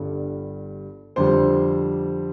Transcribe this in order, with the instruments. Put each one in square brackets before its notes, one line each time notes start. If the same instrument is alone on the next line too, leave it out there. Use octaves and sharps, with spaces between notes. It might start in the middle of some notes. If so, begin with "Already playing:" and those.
Already playing: [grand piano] G1 G2 D3 G3 A4
F2 D3 G3 C5